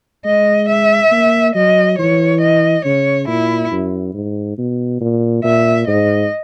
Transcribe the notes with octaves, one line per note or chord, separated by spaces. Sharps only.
G#3 D#5
E5
A#3
F#3 D#5
E3 C#5
D#5
C#3 C#5
A#2 E4
F#2
G#2
B2
A#2
A#2 E5
G#2 D#5